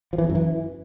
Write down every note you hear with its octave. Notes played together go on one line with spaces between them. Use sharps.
F3
E3
F2
F#2
E3